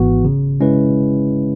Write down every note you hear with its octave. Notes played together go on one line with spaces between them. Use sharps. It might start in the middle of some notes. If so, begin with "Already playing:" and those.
Already playing: G#1 G#2 E3 B3 F#4
C#3
G#3 C#4 E4 B4